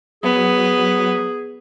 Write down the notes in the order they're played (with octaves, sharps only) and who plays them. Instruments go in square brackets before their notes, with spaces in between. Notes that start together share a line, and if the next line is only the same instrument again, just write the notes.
[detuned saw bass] F#3 [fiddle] B3 [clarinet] G#4